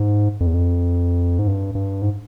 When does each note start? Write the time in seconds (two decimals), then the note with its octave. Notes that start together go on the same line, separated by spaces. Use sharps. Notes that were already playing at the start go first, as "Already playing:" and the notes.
Already playing: G#2
0.40 F2
0.47 E2
0.54 F2
1.39 G#2
1.47 G2
1.75 G2
2.02 G#2